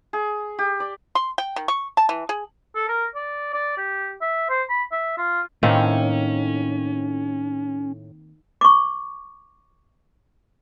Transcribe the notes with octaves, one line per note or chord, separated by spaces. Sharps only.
G#4
G4
D5
C6
G5
D#3
C#6
A5
E3
G#4
A4
A#4
D5
D5
G4
E5
C5
B5
E5
F4
A2 D#3 A#3 C4 C#4
C#6 D6